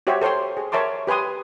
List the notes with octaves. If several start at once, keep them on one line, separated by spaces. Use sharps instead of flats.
F#4 G4 C5 C#5 E5
A4 C5 C#5 G5 C6
G#4
A#4 C#5 E5 A5 C6 D6
G4 B4 G#5 C6 D#6